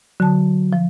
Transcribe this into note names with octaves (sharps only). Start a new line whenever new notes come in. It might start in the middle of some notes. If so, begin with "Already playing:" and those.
D3 F#3 A5
F3